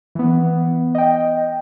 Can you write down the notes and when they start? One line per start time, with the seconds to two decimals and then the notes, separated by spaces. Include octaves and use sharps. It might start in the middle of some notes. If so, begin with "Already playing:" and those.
0.15 E3 B3
0.95 D#5 G5